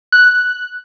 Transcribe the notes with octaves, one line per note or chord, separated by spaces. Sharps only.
F#6